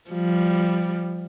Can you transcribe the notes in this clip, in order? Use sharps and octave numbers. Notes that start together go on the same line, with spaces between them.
F3 G3